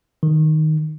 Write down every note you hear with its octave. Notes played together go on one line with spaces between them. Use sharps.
D#3